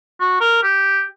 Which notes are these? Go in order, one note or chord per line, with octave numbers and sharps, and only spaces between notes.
F#4
A#4
G4